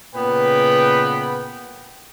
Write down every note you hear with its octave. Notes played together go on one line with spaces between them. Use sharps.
A#2 C#3 B3 B4 G5